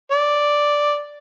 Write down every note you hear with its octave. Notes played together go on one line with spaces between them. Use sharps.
D5